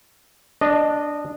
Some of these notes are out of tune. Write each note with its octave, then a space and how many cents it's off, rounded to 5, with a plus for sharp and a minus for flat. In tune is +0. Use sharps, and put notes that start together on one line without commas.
D4 +0 D#5 -20